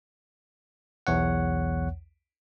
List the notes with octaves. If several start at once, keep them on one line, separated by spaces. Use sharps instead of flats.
B1 E2 C#5 F#5